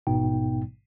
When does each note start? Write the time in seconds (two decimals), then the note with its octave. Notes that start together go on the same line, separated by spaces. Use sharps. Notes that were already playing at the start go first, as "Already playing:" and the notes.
0.07 A1 G#2 B2 B3 D#4 G5